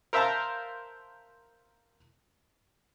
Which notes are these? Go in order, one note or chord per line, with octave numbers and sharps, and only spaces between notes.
A#4 C5 E5 F5 A5 A#5